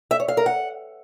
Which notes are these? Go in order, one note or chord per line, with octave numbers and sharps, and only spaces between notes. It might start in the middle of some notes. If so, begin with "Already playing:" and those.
E5
C#5
F5
A#4
F#5